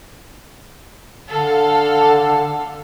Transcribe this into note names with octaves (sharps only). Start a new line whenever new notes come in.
D3 A4 F5